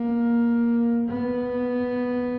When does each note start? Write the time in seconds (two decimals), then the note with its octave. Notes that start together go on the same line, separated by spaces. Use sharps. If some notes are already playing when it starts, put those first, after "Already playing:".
Already playing: A#3
1.07 B3